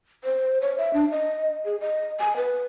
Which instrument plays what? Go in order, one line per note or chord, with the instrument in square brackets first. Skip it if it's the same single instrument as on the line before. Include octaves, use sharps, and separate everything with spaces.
[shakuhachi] C5
C#5
E5
D4
D#5
G#4
D#5
G#5
B4